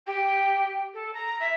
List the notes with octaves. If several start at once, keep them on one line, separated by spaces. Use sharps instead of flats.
G4
A4
A#5
E5